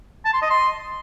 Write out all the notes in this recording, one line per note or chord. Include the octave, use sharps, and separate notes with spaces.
A5
C6
D#5
C6